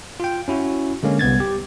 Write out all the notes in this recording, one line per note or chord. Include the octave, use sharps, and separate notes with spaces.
F4 G5
C#4 E4 F#4
D3 G#3 A#3 C#4
C2 B3 G#6 A6
G4